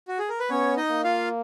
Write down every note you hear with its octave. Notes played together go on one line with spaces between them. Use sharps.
F#4
G#4
A#4
B4
B3 C#4 C#5
D#4 D#5
A#3
F4 F5